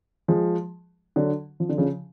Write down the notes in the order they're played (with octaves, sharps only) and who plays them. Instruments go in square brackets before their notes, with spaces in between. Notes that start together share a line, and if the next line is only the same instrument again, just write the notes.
[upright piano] F3 G#3
D3 F#3
F3
D3
C#3 F3